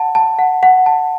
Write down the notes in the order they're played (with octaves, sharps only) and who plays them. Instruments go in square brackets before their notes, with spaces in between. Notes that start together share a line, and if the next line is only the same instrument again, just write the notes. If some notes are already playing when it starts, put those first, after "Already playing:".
Already playing: [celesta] F#5 A5
A5
F#5
F#5
A5